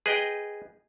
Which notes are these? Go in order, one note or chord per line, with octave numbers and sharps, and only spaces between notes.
G#4 B4 D#5 G5